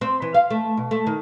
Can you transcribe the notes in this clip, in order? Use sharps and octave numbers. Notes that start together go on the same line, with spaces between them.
C4
E3
F5
A3
B2
A3
D#3